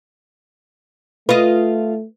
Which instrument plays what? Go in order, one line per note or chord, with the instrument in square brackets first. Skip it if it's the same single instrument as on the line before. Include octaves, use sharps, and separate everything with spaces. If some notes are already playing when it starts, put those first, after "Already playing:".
[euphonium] A3 [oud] F4 D#5 [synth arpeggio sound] B4